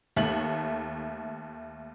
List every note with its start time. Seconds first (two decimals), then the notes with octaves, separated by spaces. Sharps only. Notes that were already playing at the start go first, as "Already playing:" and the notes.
0.16 D#2 A3 F#7